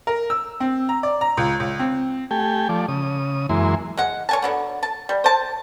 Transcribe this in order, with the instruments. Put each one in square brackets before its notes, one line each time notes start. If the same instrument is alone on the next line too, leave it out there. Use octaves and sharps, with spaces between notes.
[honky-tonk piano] A#4
E6
C4
A#5
D5
A#5
C#2
C#2
C4
[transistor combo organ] A3 G4 G5 G#5
F3 A3 D5
C#3 D#6
F#2 E3 G#3 A#3 E4 C6
[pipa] G#3 F#5
C#5 G#5 A5
D3 F#3 B3
A5
G3
C5 A5